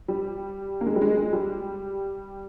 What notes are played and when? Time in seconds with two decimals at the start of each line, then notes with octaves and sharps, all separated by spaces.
0.08 G3
0.81 A#3
0.87 G#3
0.96 G3
1.01 G#3
1.17 G#3
1.33 G3